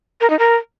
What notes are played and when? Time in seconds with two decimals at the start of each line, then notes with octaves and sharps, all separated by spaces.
0.21 A#4
0.30 D#4
0.39 A#4